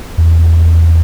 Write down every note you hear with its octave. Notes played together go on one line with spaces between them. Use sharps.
E2